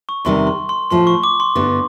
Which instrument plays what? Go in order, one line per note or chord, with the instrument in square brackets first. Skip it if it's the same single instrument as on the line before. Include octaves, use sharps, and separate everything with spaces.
[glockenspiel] C#6
[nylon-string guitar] E2 C3 D#3 G3 [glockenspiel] C6
[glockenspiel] C6
C6
[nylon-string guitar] A2 F3 A3 [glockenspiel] C6
[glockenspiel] C#6
D6
C6
[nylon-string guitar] G2 D3 G3 B3 E4